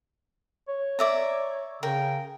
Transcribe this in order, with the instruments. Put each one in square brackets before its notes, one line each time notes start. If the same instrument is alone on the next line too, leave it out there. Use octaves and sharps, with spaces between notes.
[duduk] C#5
[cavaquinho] D5 E5 A#5
[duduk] C#3 [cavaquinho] A#4 G5